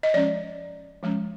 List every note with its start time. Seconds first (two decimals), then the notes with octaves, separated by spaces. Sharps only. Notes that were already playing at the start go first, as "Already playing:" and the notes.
0.03 D#5
0.14 F3 G#3 C#4 D5
1.03 F3 G#3 C#4